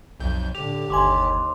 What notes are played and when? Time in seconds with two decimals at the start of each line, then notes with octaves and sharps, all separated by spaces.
0.20 B1 F2 G6
0.55 A2 D3 G4 F7
0.90 G1 D#2 G#5 C6 D6